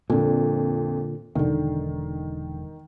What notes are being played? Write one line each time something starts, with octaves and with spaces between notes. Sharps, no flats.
F2 A#2 D3
E1 D3 D#3